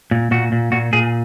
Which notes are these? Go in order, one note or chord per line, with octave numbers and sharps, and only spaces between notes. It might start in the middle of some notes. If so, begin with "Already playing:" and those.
A#2
A#2 F#4
A#2
A#2 F#4
A#2 G#4